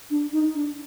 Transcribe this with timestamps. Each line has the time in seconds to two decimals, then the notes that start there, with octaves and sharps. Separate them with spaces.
0.10 D4
0.33 D#4
0.55 D4